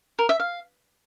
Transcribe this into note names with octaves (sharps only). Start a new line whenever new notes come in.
A#4
E5
F5